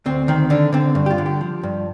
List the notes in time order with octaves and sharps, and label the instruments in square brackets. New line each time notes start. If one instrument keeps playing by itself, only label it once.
[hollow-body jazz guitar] D2 C4
D#3 C4
D3 D4
D3 C4
G2
G4
F4
D3
G4
F3
G2